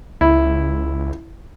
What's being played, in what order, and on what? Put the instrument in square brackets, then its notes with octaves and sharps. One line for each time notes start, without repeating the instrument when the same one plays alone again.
[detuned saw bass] C#2 [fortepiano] E4